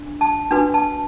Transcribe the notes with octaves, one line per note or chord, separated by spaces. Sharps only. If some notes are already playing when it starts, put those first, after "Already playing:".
Already playing: D4
A5
D4 F#4 B4 G#5
A5